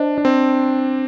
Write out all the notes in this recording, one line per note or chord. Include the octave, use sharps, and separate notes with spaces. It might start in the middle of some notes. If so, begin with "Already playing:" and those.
Already playing: D4 C5 D#5
D4
C4